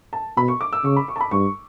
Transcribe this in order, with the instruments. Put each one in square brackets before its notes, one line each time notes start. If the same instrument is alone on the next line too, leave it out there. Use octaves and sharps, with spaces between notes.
[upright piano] A5
[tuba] B2 [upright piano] B5
[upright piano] C#6
D6
E6
[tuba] C#3 [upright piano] C#6
[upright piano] B5
C#6
A5
B5
[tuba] G2 [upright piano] C#6